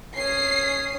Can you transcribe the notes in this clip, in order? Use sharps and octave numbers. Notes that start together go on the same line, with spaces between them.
C#4 D#6 C7